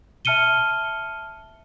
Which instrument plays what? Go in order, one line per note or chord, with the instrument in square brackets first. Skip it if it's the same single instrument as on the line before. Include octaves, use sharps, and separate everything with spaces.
[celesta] E5 A5 F6 C#7 D#7 G7